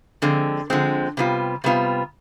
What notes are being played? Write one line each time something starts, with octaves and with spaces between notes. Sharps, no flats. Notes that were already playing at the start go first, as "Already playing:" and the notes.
D3 F3 G#3 C4
D3 F3 G#3 C4
C3 G3 B3 F4
C3 G3 B3 F4